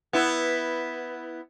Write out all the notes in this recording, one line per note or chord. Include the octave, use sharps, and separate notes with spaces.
B3 E4